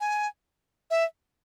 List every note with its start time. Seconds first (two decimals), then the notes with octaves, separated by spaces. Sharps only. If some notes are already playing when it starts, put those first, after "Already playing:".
0.01 G#5
0.91 E5